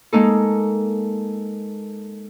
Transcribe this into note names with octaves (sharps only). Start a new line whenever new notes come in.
G#3 A#3 D#4 A4